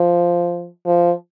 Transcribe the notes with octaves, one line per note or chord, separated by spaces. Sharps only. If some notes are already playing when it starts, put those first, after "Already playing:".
Already playing: F3
F3